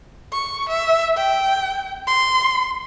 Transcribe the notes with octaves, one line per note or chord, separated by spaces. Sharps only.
C#6
E5
G5
C6